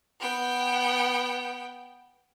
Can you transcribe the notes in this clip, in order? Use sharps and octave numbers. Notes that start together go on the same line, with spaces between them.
B3 G5